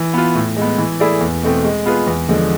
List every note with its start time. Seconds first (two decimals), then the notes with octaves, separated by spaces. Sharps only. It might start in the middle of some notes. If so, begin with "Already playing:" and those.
Already playing: E3
0.14 B3 F4
0.35 A2
0.57 G#3 B3
0.78 E3
1.00 A3 E4 G#4 D5
1.21 E2
1.43 B2 A3 C4
1.64 G#3
1.85 B3 F4 G#4 B4
2.07 E2
2.29 D3 F3 G#3